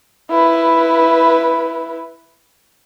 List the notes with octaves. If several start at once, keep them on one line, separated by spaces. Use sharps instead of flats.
E4 B4